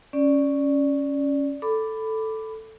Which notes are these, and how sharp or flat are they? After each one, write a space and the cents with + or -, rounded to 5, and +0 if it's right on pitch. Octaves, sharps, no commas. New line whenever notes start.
C#4 +0 D5 +0
A4 +0 B5 +10 D6 +0